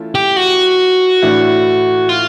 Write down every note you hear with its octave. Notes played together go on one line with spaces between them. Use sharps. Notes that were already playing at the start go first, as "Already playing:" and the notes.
Already playing: E3 A3 C#4 F4 A4
G4
F#4
A2 E3 A3 D4
F4